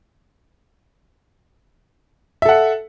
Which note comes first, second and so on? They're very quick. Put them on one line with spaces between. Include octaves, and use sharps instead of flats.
E5 A4 F#5